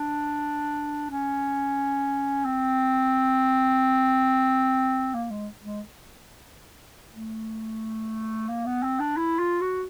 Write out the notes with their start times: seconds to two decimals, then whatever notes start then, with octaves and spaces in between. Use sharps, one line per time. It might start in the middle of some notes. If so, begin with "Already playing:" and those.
Already playing: D4
1.11 C#4
2.45 C4
5.14 A#3
5.30 G#3
5.64 G#3
7.14 A3
8.49 A#3
8.66 B3
8.83 C4
9.00 D4
9.17 E4
9.39 F4
9.61 F#4